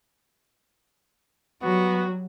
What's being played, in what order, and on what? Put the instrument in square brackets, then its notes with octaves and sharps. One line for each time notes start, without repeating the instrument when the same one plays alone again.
[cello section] F#3 G3 [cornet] B3 [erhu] F#4